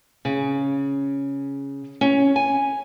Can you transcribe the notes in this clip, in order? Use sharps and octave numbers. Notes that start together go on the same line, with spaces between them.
C#3
C#4
G#5